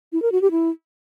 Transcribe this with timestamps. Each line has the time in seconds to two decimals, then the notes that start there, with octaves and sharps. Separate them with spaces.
0.13 E4
0.22 A#4
0.32 F#4
0.42 G4
0.51 E4